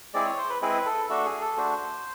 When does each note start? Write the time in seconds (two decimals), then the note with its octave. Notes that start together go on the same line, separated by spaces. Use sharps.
0.14 G#3 C4 E4 G#4 D5
0.26 C#5
0.38 C5
0.50 B4
0.62 G#3 C4 E4 G#4 B4
0.86 A4
1.09 A3 D4 F#4 A4
1.26 G#4
1.41 A4
1.57 A3 D4 F#4 C5